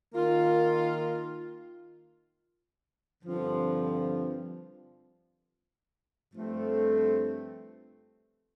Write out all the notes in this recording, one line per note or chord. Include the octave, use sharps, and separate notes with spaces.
D#3 A#3 F4
G2 D3 F3 C4
G2 F3 A3 C4